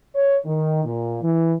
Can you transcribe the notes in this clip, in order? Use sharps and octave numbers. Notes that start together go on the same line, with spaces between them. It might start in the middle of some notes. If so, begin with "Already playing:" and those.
C#5
D#3
A#2
E3